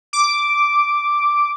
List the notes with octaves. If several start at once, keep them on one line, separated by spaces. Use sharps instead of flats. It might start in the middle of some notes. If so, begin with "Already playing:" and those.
D6